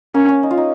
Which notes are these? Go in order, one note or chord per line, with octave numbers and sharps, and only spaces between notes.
A#3 C#4
C#4
D#4
F4
D#4